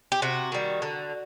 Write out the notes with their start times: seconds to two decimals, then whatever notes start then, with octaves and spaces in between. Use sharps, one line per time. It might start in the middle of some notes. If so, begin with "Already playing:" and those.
0.12 G4
0.22 C3 F#4
0.52 D#3 G3
0.82 D3